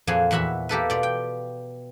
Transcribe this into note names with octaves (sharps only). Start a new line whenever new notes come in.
F2 A#2 C4 F4 F#4 G#4
E2 A#2 F#4 E5 B5
A#3 G4 A4 B4
B2 F4 D5
G5